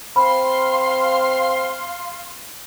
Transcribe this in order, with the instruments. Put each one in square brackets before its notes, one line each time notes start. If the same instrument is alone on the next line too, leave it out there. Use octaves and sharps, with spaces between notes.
[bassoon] C4 [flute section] F5 C6 [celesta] B5 [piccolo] F6